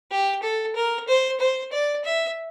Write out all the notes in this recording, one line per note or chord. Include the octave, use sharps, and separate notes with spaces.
G4
A4
A#4
C5
C5
D5
E5